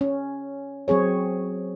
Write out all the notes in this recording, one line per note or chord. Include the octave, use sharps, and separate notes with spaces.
C#4
F#3 C4 G#4 C#5